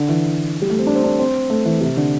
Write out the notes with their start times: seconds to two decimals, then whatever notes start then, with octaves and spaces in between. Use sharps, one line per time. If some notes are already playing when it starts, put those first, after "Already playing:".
Already playing: D3
0.09 E3
0.62 G3
0.70 A3
0.79 C4
0.87 D4
0.95 C4
1.04 D4
1.19 C4
1.50 A3
1.65 E3
1.81 C3
1.97 D3